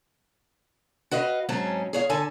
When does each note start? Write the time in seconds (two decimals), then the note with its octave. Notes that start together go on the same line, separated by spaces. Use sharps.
1.11 F#4 B4 D#5 F5
1.49 G#2 F#3 C4 C#4 G#4 A5
1.93 G#4 C#5 F5
2.09 D3 A4 G#5 A5